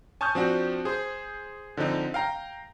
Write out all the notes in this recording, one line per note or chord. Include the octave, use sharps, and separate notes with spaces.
G#5 A5 C#6 D#6 F6 G6
F3 C4 D4 F#4
G#4 C5
D3 F3 C4 D#4
F5 G5 A#5